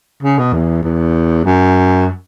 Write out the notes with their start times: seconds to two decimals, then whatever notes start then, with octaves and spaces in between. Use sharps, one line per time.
0.23 C#3
0.39 B2
0.53 E2
0.83 E2
1.45 F#2